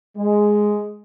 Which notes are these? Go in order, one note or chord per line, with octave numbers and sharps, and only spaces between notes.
G#3